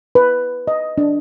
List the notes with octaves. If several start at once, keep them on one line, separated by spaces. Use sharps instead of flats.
B4
D#5
D4